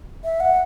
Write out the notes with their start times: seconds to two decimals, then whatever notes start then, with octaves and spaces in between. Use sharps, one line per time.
0.24 E5
0.40 F#5